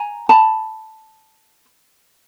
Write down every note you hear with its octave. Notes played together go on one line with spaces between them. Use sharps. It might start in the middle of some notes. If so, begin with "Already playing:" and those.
Already playing: G#5 A#5
A5 B5